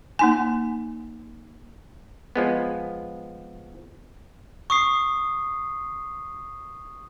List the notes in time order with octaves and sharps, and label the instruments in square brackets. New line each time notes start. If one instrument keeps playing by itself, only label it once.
[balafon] A#3 D#4 G#5
[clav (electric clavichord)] F3 G#3 B3
[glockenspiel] C#6 D#6 C7